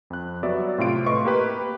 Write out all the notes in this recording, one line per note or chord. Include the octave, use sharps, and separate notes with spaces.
F2 F#6
F#3 G3 B3 F#4 D5 E5
A2 C3 F4 D7
A2 B4 D#5 C6 C#6
A#3 G4 B4